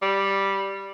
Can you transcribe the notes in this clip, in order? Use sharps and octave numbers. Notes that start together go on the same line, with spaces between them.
G3